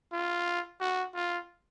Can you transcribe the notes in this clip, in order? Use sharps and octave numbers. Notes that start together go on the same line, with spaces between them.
F4
F#4
F4